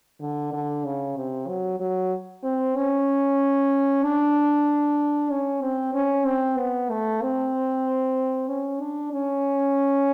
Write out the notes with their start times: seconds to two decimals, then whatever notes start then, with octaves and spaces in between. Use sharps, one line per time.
0.20 D3
0.53 D3
0.85 C#3
1.17 C3
1.48 F#3
1.80 F#3
2.43 C4
2.76 C#4
4.04 D4
5.30 C#4
5.62 C4
5.94 C#4
6.25 C4
6.58 B3
6.90 A3
7.21 C4
8.49 C#4
8.81 D4
9.13 C#4